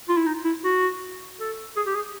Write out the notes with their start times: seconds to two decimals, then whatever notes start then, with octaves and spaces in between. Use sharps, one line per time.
0.09 F4
0.17 E4
0.26 D#4
0.45 E4
0.65 F#4
1.40 A4
1.77 G#4
1.87 G4
1.95 G#4